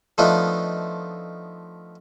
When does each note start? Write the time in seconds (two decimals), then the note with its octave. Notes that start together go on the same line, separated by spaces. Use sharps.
0.18 F3 A3 B3 D4 D#4 F4